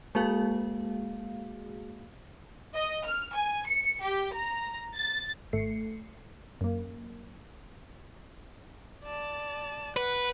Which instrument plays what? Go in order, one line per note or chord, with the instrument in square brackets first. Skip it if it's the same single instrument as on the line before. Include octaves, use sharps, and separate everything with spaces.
[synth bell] G#3 A#3 F#4 G#4 F5
[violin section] D#5
F6
G#5
C#7
G4
A#5
A6
[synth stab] G#1 A3 C7 C#7
F#2 A#3
[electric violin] D5 A5
[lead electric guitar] B4 [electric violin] F#5